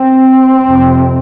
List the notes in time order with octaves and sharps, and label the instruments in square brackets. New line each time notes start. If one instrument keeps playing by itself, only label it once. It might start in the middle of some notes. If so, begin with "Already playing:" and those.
Already playing: [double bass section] C4
F2 C3